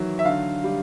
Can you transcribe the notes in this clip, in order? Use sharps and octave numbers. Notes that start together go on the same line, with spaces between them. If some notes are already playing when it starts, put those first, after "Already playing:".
Already playing: D#3 E3 F#3
E5
D3 F5
G3